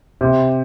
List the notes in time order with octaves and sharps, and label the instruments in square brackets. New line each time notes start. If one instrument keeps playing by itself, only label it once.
[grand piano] C3